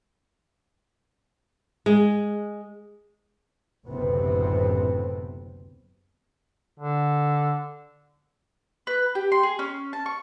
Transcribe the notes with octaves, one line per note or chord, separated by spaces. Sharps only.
G#3
F#1 D2 A2 C3 B3 C4
D3
B4
G4
C6
G#4
C#4
A5
C#6